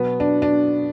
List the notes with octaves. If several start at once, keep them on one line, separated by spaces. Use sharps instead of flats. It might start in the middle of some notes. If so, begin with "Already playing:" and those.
Already playing: B2 F#3 B3
D4
D4